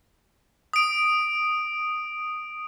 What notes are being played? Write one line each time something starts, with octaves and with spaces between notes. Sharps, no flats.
D#6 D7